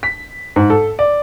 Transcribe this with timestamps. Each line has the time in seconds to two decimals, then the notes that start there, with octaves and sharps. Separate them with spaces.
0.03 B6
0.56 G#2
0.70 A4
0.99 D5